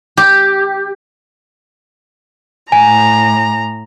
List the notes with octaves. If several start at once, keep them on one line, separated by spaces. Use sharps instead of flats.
G4
A2 G#5 A#5